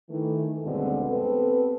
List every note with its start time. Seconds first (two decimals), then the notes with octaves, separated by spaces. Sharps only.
0.10 D#3 E3 A3
0.64 D2 G2 B2 D3 G#3 C4
1.10 B3 C4 G4 A4 B4